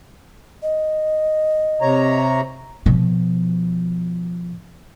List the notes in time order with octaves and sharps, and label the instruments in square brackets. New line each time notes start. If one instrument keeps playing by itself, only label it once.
[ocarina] D#5
[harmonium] C3 C#5 A#5
[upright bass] B2 F3